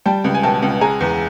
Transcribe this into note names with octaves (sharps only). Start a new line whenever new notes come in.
G3 G5 A5
C#2
G#5
B2 G5 A5
C#2
G#3 G#5 A#5
E2